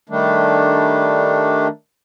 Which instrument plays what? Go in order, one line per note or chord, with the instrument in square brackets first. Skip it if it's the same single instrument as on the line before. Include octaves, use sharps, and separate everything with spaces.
[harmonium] D#3 G3 A3 D4